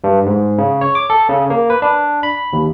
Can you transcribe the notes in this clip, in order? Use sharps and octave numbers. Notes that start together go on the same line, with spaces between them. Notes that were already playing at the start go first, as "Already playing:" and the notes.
G2
G#2
C#3
C#5
D6
A4
C#3
A#3
B4
D4
B5
D#2